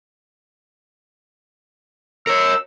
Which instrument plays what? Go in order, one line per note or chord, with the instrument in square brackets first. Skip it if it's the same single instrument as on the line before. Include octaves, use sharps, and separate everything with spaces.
[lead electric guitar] A#4 C#5 [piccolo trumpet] E6